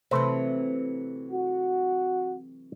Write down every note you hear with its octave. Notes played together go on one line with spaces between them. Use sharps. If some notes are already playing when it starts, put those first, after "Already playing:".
C3 E3 F#3 A3 B4 C5
F#4